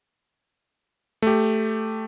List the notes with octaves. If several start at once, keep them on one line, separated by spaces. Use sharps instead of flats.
A3 G4